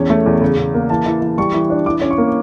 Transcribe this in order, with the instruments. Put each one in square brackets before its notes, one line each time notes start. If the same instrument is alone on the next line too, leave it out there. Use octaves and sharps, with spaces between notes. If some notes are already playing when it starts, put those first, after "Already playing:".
Already playing: [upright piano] E2 C#4
A3
E2
C#3
C#3
A#3
E3 A5
E3
E3
G3 C#6
E3
D4
E3 D6
C#4
C#6
A#3